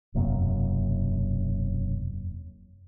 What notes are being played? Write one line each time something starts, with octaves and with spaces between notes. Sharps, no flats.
E1 F#2 C3 A#3